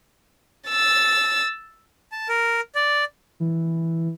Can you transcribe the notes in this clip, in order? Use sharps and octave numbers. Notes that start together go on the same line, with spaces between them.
E6 A6
A5
A#4
D5
E3